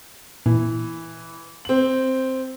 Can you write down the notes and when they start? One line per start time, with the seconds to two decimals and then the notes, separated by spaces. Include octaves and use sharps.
0.46 A#2 E3
1.65 C4 F#7